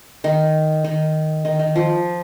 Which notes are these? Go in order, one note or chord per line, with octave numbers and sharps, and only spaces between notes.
D#3
D#3
D#3
D#3
F3